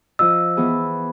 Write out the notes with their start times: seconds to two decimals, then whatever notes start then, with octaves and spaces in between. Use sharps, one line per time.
0.19 F3 F4 D#5 E6
0.57 E3 B3 G#4